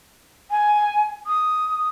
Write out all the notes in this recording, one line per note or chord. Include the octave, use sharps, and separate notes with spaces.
G#5
D#6